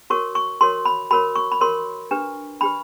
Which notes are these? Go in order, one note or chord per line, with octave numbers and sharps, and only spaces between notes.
F#4 A#4 C#5 C#6
C#6
F#4 A#4 C#5 C6
B5
F#4 A#4 C#5 B5
C#6
B5
F#4 A#4 C#5 C6
D4 G4 B4
D4 G4 B4 B5